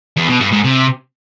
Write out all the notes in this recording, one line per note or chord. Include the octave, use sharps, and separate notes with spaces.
E2
B2
G2
G#2
C3